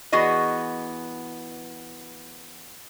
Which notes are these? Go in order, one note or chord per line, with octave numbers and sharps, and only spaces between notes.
E3 B3 F#4 G#4 D#5